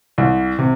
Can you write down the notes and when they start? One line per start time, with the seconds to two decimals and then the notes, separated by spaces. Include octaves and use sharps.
0.18 C2
0.59 C3